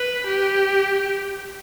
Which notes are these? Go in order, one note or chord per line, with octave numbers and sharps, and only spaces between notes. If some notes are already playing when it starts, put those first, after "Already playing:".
Already playing: B4
G4